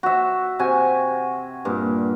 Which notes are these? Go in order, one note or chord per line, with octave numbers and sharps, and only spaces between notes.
F#4 E5
C3 F#4 G#5
G2 A#2